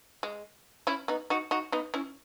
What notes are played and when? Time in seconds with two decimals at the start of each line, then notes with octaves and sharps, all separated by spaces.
0.23 G#3
0.87 C#4 E4
1.08 B3 D#4
1.30 D#4 F#4
1.51 D#4 F#4
1.72 B3 D#4
1.94 C#4 E4